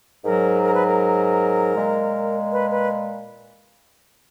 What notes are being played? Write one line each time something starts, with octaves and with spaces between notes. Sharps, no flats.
G#2 F#3 A#4
A#4
B4
A#4
A#2 G#3
B4
B4